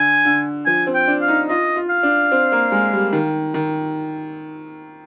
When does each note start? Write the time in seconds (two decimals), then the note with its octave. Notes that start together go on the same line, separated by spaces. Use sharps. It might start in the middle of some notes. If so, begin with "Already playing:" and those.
Already playing: D3 G#5
0.25 D3
0.66 F3 G#5
0.87 C4
0.94 G5
1.08 D4
1.22 F5
1.28 D#4
1.49 F4 D#5
1.76 F4
1.90 F5
2.03 D4
2.32 C4
2.52 A#3
2.72 G#3
2.93 G3
3.13 D#3
3.54 D#3